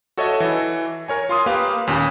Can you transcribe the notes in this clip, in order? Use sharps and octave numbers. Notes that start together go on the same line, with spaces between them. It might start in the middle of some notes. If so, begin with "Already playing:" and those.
F#4 A4 C#5 D#5 E5
E3
A#4 C#5 G#5
F4 C6 D#6
A#3 G4 B4 F5
D#2 A#2 C#4